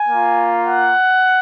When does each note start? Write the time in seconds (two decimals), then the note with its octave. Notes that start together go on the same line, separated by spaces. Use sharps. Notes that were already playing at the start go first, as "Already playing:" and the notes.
Already playing: G#5
0.09 A#3 F4
0.62 F#5